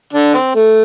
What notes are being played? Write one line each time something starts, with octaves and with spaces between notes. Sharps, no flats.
D3 D4
C4
A3